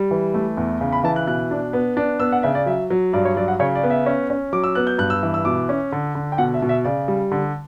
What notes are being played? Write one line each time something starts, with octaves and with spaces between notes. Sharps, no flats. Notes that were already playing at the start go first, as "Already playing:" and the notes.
Already playing: G3
E3
A3
E2
C#3
B5
E3 A5
F#6
B2 F#6
D4
B3
D4
B3 E6
F#5
C#3 E5
D5
F#3 E5
F#3
G2 D5
C#5
F#3 D5
F#5
C#3 C#5
D5
B3
E5
C#4
C#4
F#3 D6
E6
B3 F#6
G6
G2 F#6
E6
E3
E6
B2 D6
C#4
D3
D3
G5
B2 F#5
E5
B2
E5
C#3 D5
G3
D3